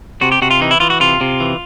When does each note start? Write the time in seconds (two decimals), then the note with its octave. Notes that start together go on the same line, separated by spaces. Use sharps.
0.21 C3 F#4
0.32 G4
0.42 C3 F#4
0.51 F4
0.61 E3 D#4
0.71 E4
0.80 E3 F4
0.90 F#4
1.00 C3 F4
1.21 C3
1.40 E3